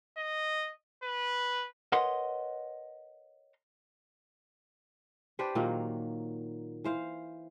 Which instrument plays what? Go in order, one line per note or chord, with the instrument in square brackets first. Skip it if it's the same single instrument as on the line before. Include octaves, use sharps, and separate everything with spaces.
[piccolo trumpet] D#5
B4
[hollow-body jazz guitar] A#4 B4 C#5 D#5 F#5 C6
[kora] D4 G4 B4 C5
A#2 D#3 F#3 A#3
E3 C5 F5